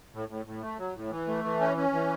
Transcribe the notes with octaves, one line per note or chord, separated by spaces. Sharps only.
A2
A2
A2
A3
F#3
A2
E3
A3
E3
C#4
C#4
E3